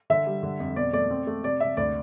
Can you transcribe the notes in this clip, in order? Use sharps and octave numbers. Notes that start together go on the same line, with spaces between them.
D3 E5
G3
D3
F2
B2 D5
A3 D5
C4
A3
C3 D5
C3 E5
D2 D5